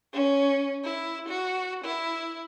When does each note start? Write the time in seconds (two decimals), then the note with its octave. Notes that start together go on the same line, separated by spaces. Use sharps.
0.13 C#4
0.84 E4
1.28 F#4
1.84 E4